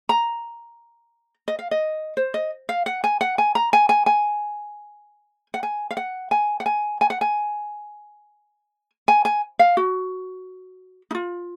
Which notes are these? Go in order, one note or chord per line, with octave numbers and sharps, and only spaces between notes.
A#5
D#5
F5
D#5
C5
D#5
F5
F#5
G#5
F#5
G#5
A#5
G#5
G#5
G#5
F#5
G#5
F5
F#5
G#5
F#5
G#5
G#5
F#5
G#5
G#5
G#5
F5
F#4
D#4
F4